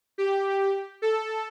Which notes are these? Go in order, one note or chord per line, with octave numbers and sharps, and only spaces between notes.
G4
A4